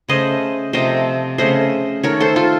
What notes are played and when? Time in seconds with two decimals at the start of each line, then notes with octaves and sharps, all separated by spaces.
0.09 C#3 A3 C5 D#5
0.73 C3 F3 A3 C5 D#5
1.38 C#3 A3 C5 D#5
2.03 D#3 A3 A#4 C#5
2.21 A4 C5
2.36 F4 A4